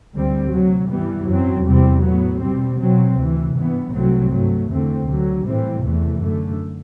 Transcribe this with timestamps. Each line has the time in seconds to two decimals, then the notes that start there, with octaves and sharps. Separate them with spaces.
0.13 D2 D3 G3 C4
0.51 D2 C3 F#3
0.89 G2 E3 G3 B3
1.27 F#2 F#3 C4
1.65 E2 C3 G3 C4
2.03 A2 F#3 B3
2.41 B2 G3 C4
2.79 B2 F#3 C4
3.17 D2 C3 E3
3.55 G2 E3 B3
3.92 C2 C3 F#3 A3 C4
4.31 G2 F#3 A3
4.69 E2 D3 A3 C4
5.07 D2 D3 F#3
5.44 A2 E3 G3 C4
5.82 E2 C3 E3 A3
6.20 F#2 D3 A3